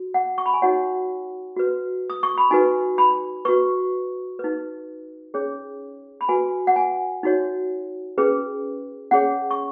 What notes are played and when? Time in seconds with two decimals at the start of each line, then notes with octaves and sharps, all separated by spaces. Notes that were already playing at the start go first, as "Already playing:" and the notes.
Already playing: F#4
0.14 F#5
0.38 C#6
0.46 B5
0.54 G#5
0.62 D#4 F#4 C#5 F#5
1.57 F#4 B4
2.10 D#6
2.23 C#6
2.38 B5
2.51 D#4 F#4 B4 G#5
2.98 B5
3.45 F#4 B4 C#6
4.39 D#4 B4
5.34 C#4 G#4 C#5
6.21 B5
6.29 F#4 B4 G#5
6.67 F#5
6.76 G#5
7.23 D#4 F#4 C#5
8.18 C#4 G#4 B4
9.11 C#4 G#4 C#5 F#5
9.51 C#6